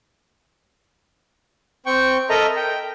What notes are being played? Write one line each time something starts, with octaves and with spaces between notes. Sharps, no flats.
C4 G5 C#6
A4 A#4 D#5 E5 A#5
G5